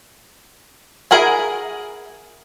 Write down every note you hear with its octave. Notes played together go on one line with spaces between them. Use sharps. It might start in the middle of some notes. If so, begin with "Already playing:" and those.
E4 G#4 A#4 F#5 G#5